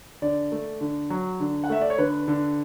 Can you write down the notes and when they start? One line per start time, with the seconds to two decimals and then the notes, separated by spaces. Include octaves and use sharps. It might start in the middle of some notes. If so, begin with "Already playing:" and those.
0.22 D3 D5
0.52 A3
0.81 D3
1.10 F#3
1.40 D3
1.64 F#5
1.70 A3 E5
1.81 D5
1.90 C#5
1.98 D3 B4
2.28 D3